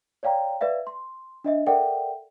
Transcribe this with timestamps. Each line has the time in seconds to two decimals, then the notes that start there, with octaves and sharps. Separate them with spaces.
0.23 C#5 D5 F5 G5 A#5
0.61 B4 D5 E5 F5
0.87 C6
1.44 D4 D#5 E5
1.67 A4 A#4 D5 E5 F#5 G5